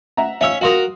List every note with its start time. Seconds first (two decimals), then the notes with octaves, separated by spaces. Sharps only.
0.17 E5 F#5 A#5
0.41 C#4 C#5 E5 F5 E6
0.61 F#4 A#4 F5 C6 D#6